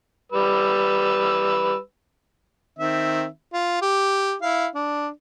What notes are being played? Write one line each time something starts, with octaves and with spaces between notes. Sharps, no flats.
G3 B4 E6
D#3 C4 E5
F4
G4
E4 F5
D4